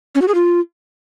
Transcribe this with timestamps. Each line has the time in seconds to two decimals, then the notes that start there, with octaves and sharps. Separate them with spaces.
0.15 C#4
0.22 F#4
0.28 G#4
0.35 F4